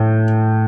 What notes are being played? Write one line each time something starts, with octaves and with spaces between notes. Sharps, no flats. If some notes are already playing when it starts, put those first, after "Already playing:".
Already playing: A2